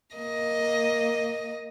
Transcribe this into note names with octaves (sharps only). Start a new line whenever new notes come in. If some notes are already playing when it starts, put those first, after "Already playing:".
A#3 D#5